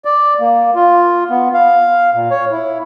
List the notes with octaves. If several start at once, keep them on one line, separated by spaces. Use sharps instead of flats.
D5
A#3
F4
B3
F5
A#2
C#5
E4